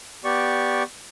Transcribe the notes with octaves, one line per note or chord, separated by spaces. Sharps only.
B3 G4 D5 C#6